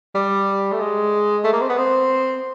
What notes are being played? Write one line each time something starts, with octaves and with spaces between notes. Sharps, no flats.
G3
A3
G#3
A3
A#3
C4
B3
C4